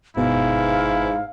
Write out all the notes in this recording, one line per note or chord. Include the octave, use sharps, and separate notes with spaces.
G1 G#2 B2 E4 B4 F5